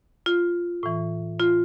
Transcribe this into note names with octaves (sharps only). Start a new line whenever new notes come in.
F4
A2 E3
F4